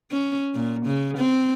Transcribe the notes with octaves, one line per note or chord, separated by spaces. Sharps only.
C#4
A#2
C#3
C4